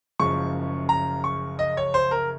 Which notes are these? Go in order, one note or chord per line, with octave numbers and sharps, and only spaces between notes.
F#1 F#2 C#3 F3 G#3 C#6
A#5
C#6
D#5
C#5
C5
A#4